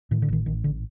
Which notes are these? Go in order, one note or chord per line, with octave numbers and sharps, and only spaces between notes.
A2 D#3
D3
A1 D#3
A1 D#3
A2 D3